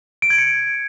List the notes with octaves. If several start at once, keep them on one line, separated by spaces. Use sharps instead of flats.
D7
G#6
C#7